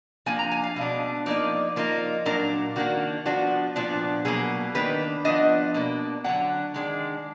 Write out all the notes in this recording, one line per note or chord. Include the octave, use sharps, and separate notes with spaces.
F3 A#3 D4 G#5
A#5
G#5
F5
B2 G#3 D4
F3 A#3 D#4 D5
F3 A#3 D#4
A#2 F#3 D4 A#4
D#3 A#3 D4 F#4
F3 B3 D4 F#4
A#2 F3 B3 D4
B2 F#3 A#3 G#4
D#3 A#3 D4 B4
F3 B3 D4 D#5
B2 A#3 D4
D3 F#3 D4 F#5
D#3 G#3 D4